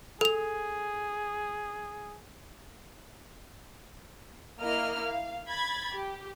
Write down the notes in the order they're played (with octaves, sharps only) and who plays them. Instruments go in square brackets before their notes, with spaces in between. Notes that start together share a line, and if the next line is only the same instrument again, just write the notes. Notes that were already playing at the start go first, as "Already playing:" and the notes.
[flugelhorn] G#4 [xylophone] A4 F7
[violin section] A#3 E4 D#5 F6
F5
B5 G#6 A6
G4